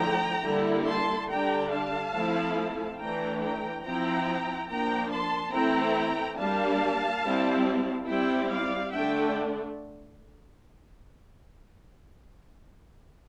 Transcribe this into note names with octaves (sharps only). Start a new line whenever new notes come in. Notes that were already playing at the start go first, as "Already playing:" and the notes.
Already playing: D3 F3 A3 E4 G5 A#5
D3 G3 A#3 E4
A5 C6
D3 G3 D4 G5 A#5
F5 A5
F3 A3 C4 E4
E3 A3 D4 G5 A#5
G5 A#5
F3 C4 E4 G5 A#5
F3 A#3 D4 G5 A#5
A5 C6
E3 A3 C4 E4 G5 A#5
G3 A#3 D4 F5 A5
G3 C4 E4
G3 C4 E4 E5 G5
D5 F5
D3 A3 D4 E5 G5